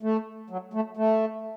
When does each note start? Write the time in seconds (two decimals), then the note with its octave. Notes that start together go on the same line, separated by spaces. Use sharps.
0.03 A3
0.50 F#3
0.73 A3
0.97 A3